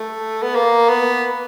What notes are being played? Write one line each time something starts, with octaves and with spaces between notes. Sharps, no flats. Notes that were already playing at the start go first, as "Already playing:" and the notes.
Already playing: A3
B3
A#3
B3